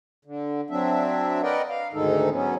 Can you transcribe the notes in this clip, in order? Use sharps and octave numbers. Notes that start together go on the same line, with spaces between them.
D3
F#3 C4 D4 E5
A#4 B4 D5 D#5 F#5 G5
F5
D2 G#2 D#3 G#3 D#4 A4
F#3 B3 C#4